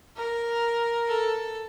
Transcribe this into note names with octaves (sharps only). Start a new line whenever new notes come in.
A#4
A4